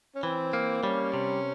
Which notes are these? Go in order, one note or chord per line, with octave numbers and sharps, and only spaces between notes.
C#4
E3 C4
A#3
G3 C#4
C3